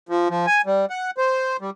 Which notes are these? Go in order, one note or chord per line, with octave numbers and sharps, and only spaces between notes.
F3
F3
G#5
G3
F#5
C5
G3